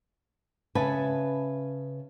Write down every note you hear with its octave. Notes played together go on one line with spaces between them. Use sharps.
C#3 B4 E5 G#5 A5